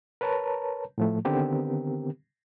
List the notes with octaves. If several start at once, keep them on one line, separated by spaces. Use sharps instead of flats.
A#4 B4 C#5 A5 A#5
A2 F3 A3
D3 D#3 B3 C4 G4 A#4